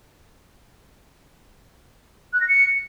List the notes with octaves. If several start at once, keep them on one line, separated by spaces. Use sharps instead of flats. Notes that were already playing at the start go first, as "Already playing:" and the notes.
F#6
A#6
C#7